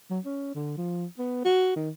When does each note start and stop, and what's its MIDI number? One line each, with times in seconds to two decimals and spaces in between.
0.10 0.20 54
0.25 0.51 61
0.55 0.76 50
0.77 1.06 53
1.18 1.40 59
1.45 1.75 66
1.76 1.90 51